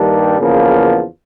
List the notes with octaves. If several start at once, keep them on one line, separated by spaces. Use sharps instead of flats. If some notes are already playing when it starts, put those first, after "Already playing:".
Already playing: G2 D#3 G3 A#3 D4
E2 C#3 F3 A#3